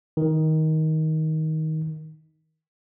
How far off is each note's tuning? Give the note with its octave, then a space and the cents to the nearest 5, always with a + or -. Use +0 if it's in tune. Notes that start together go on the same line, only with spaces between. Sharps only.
D#3 +15